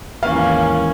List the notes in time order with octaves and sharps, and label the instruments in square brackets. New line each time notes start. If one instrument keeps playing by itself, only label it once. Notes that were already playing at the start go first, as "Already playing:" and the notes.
[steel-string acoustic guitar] D#2 G#2 E3 [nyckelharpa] A#3 C#4 [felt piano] F5